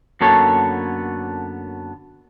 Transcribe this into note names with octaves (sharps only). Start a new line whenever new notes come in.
F#2 D3 A#3 B3 A4 C#5